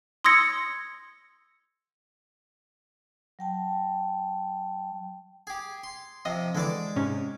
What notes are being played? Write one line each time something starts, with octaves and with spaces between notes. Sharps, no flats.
C6 D#6 E6 G#6 A#6 C#7
F#3 G5 A5
G4 G#4
C6
C3 F3 D#5
D3 E3 G#3 D5 D6
G#2 C3 C#4